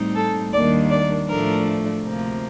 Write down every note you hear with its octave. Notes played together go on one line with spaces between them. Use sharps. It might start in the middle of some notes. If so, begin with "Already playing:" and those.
Already playing: A2 G3 C4 D#4
A4
D#2 D#3 G3 A#3 D4 D5
D5
A2 F3 A3 D4 A#4
D2 C3 F3 A#3